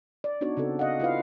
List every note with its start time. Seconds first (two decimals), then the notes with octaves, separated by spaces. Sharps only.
0.24 D5
0.41 B3 D4 D#4 F#4 C#5
0.57 C#3 C4 F#4 A4
0.79 C#3 D#5 F5 F#5
1.00 E4 F4 B4 F5